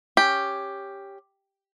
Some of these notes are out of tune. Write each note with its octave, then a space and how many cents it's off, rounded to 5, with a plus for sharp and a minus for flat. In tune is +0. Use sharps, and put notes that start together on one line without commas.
C#4 +0 G4 +5